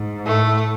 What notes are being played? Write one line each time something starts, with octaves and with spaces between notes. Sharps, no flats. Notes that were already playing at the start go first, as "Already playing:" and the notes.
Already playing: G#2
A2 A3